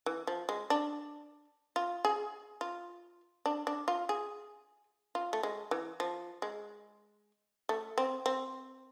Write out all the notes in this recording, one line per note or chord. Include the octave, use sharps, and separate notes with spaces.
E3
F3
G#3
D4
F4
G#4
F4
D4
D4
F4
G#4
F4
A3
G#3
E3
F3
G#3
A3
C4
C4